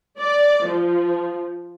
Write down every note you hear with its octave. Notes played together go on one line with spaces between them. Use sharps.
D5
F3